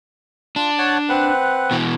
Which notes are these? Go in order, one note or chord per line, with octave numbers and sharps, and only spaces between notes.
D4 F4
C#5 F#5 A5
C4 B4 F#5
B2 E3